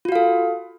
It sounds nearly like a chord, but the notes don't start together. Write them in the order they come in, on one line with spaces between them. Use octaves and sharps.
F4 F#4 F5 A4